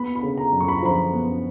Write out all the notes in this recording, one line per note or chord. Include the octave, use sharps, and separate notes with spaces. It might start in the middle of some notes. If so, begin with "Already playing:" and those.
Already playing: B3 B5
B5
C#3
A#5
F#2
C#6
B5
A#5
F3 B5
B3